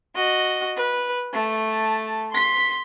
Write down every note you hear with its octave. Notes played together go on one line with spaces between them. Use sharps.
F#4 D#5
B4
A3 A5
C6 B6